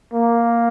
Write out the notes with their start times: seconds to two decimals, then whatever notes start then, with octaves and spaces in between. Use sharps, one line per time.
0.13 A#3